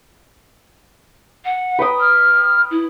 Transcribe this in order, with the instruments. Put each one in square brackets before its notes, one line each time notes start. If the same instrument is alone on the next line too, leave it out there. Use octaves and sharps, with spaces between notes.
[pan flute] F#5
[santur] B4 G5 D#6
[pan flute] F6
E4